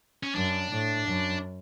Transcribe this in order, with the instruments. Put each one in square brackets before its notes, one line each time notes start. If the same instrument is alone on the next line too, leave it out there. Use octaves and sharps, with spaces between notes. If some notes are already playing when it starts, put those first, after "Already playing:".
[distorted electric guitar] C#4
[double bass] F#2 [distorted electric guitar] D4
[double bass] A2
F#2